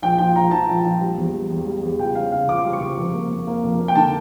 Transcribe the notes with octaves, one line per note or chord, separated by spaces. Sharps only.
A#1 G5
F3 G5
A#1 A#5
F3 A5
A#1
A#1
G3
E2
G3
E2
G3
E2
C#2 G5
C#3 F5
C#3 F5
C#2 D6
G3
C#6
C#2
F1
A#3
A#3
A#3
F1
A#3
G5
D3 A5